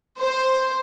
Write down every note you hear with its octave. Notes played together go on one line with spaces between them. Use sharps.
C5